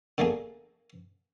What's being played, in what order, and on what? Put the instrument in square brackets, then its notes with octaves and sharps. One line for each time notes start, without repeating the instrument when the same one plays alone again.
[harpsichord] D3 A3 A#3 G#4